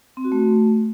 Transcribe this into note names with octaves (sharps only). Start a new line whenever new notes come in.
C4
F#4
A3